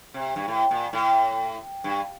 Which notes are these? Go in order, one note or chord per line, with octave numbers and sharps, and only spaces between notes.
C3
G2
A2
A#2
A2
G2